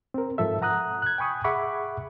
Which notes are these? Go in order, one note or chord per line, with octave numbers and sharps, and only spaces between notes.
C4 A#4
G#2 F3 A4 E5
F#5 A#5 D#6 F#6
F#6 G#6
G5 G#5 B5 C#6 D#6
G#4 E5 F#5 B5 C#6 D6